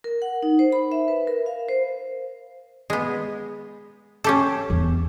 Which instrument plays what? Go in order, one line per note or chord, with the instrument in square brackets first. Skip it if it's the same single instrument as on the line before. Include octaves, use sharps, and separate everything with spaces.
[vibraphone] A#4
F#5
D#4
C5
B5
E5
B4
A#4
F5
C5
[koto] G#3 B3
C#4 G4 A4
[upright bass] E2